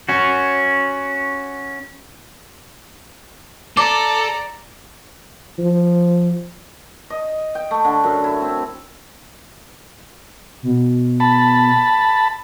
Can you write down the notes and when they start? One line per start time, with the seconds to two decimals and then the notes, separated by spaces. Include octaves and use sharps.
0.09 C#4 F#4
3.77 A4 D5 A#5 D6
5.59 F3
7.10 D#5
7.55 G5
7.71 A3
7.85 D3
8.04 F#2
8.24 E4
8.42 C4
10.63 B2
11.20 A5 B5